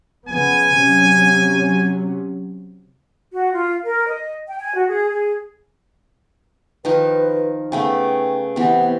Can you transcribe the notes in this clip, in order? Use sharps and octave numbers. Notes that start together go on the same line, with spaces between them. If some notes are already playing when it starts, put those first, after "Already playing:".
C#3 F3 B3 G#5
C3 F#3 C#4
F#4
F4
A#4
D#5
G5
G#5
F#4
G#4
G#4
D#3 F3 D#4 B4
C#3 A3 B3 G5
C3 E3 B3